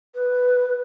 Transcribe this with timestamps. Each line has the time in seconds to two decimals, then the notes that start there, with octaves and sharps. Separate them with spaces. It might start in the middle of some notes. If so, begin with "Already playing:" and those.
0.14 B4